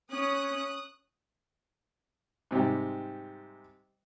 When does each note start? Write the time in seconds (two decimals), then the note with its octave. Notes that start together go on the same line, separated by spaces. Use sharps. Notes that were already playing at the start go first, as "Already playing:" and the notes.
0.11 C#4 D#6 F#6
2.51 G#2 C3 G3 G4